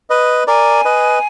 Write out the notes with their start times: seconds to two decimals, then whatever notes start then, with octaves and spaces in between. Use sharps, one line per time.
0.10 B4 D#5
0.47 A#4 D5 G#5
0.85 B4 D#5